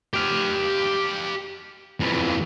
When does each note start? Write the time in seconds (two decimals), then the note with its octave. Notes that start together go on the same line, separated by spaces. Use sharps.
0.14 G4 F5
2.00 F2 E3